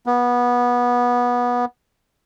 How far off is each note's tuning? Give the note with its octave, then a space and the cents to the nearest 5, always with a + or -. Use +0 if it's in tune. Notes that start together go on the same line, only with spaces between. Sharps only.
B3 -20